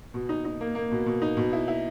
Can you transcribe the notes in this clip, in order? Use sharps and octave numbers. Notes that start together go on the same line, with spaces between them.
B2
D#4
D#4
A#3
A#3
B2
B2
D#4
B2
E4
E4